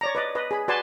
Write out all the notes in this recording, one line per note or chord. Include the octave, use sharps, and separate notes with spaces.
C#5 D5 A#5
B4 D5 D#5
B4 D#5
G#4 B5
F#4 B4 D5 G#5 A5 C6